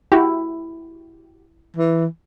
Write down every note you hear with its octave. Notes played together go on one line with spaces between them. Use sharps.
E4 F#4 G4
E3